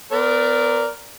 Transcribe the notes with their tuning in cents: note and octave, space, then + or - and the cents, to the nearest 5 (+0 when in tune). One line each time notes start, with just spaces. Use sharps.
B3 +30 A#4 +0 D5 -15